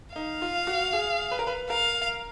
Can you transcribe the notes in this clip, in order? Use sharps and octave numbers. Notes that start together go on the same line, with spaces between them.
D#4 F5
F4
F#4
G#4
B4
A#4
B4
A#4 F5